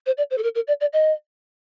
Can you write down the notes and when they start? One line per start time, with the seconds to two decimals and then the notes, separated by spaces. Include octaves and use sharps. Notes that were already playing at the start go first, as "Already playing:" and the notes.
0.06 C5
0.18 D5
0.31 C5
0.38 A4
0.43 A#4
0.55 A#4
0.68 D5
0.81 D5
0.93 D#5